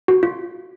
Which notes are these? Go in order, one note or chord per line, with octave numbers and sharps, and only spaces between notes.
F#4
F4